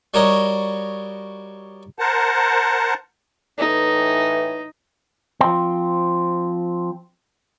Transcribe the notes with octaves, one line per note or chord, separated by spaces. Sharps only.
G3 F#4 A#4 C#5 D#5
A#4 C5 F#5 A5
A2 E3 D#4
F3 C4